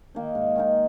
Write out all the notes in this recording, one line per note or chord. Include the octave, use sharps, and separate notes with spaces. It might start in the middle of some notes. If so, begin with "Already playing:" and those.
D#3 A#3 D#4
G#2
D#3 A#3 D#4